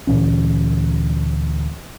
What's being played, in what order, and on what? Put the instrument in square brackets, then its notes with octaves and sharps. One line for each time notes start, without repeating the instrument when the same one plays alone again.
[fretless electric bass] D2 A#2 E3 C#4